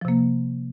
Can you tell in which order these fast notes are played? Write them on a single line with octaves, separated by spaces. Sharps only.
F3 C3 A#3